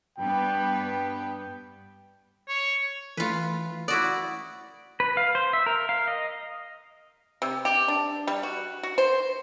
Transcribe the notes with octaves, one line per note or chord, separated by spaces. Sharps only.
G2 B3 B4 G5
C#5
E3 A3 F4 B4
E4 F#4 D5 D#6 F#6
B4
F5
C5
E5
A#4
F5
D#5
C3
G4
D4
G3
F#4
F#4
C5